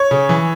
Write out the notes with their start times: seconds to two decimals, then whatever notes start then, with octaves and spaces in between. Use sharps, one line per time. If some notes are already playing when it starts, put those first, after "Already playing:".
Already playing: C#5
0.11 C#3
0.29 E3